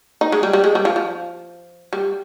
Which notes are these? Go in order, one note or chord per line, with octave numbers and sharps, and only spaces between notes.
D#4
G#3
G3
G3
G#3
G3
F3
F3
G3